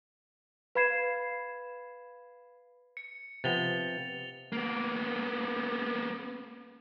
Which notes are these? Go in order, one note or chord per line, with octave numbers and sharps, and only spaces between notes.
B4 F5 B5 G#6 C7 E7
C#7
C3 F3 B3 A6 F7 G7
A#3 B3